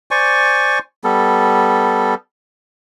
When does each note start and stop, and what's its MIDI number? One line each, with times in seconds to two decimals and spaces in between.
0.11 0.79 72
0.11 0.79 74
0.11 0.79 80
0.11 0.79 85
1.04 2.14 55
1.04 2.14 59
1.04 2.14 69